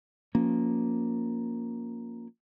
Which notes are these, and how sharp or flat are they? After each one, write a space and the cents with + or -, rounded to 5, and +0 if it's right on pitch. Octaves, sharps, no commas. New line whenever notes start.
F3 +20 A#3 +0 C#4 +0